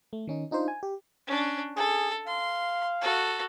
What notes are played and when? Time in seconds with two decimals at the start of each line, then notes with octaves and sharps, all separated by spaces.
0.13 A3
0.27 D#3 C#4 D#4
0.51 D4 D#4 F4 C5
0.68 G#5
0.83 G4
1.27 C#4 D4
1.77 G#4 A4
2.27 F5 C6
3.01 F#4 A4